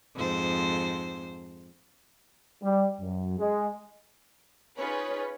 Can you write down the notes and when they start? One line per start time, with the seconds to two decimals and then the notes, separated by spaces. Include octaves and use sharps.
0.15 F2 G#2 C5
2.63 G3
3.00 F#2
3.38 G#3
4.77 C#4 D#4 F4 G#4 B4 C#5